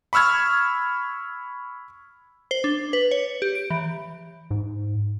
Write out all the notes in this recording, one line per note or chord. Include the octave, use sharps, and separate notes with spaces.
B5 C#6 E6 F6 G#6
C5
D4
B4
C#5
G4
D7
E3
G#2